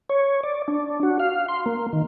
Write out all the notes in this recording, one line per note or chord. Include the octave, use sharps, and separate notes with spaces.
C#5
D5
D4
F#4
F5
C6
A#3
D#3